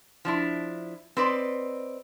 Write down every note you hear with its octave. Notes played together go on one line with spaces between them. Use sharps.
F3 D4 E4
C4 B4 D5 D#5